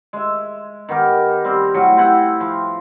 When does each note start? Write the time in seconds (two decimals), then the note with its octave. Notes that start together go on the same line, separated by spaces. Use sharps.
0.13 G#3 E5
0.89 D#3 B3 G4 A#4
1.45 G3 C4
1.74 A2 F#3 G3
1.97 C4 E4 F#5 G5
2.40 F3